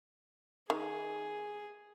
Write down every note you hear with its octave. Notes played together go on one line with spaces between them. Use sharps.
D#3 G#4